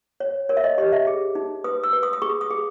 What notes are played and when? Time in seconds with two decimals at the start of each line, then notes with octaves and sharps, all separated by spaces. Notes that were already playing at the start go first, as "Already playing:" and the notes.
0.20 C#5
0.49 A#4 C#5
0.57 E5
0.64 D#5
0.78 G4 D#5
0.93 E5
1.07 G#4
1.35 D#4
1.64 B4 D#6
1.83 E6
1.93 B4
2.03 D#6
2.13 D#6
2.22 G#4 C#6
2.41 D#6
2.50 G#4